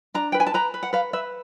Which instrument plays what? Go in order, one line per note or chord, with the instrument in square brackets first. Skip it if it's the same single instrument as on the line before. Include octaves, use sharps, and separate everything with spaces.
[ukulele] D4 A#5
B4 G5
G#5
A5
B4 A#5
B4
F#5
B4 F5
B4 E5